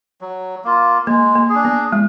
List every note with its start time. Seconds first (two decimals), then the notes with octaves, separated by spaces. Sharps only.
0.21 F#3
0.64 A#3 F4
1.07 G#3 A#3
1.35 A#3
1.49 G#4
1.55 D4
1.65 B3
1.92 G#3